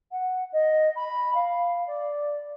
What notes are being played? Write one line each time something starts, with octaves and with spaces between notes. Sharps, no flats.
F#5
D#5
B5
F5
D5